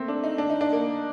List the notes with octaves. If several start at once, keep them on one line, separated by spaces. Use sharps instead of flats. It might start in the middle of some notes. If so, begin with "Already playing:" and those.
Already playing: A3 A#3 C4
D4
D#4
D4
D#4
D4
A#3